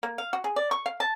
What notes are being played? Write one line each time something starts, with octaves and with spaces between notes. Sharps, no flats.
A#3
F5
F#4
G#4
D5
C#6
F5
A5